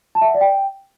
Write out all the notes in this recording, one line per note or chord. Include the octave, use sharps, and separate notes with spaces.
A5
E5
F#5
D5
G5